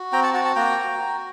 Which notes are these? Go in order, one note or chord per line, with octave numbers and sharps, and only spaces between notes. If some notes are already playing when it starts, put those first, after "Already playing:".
Already playing: F#4
C4 G5 A#5
F#5 A5
F#4 F#5 A5
F#5 A5
A#3 G5 A#5
F#4
F#4